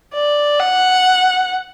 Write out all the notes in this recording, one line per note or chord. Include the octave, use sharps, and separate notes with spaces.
D5
F#5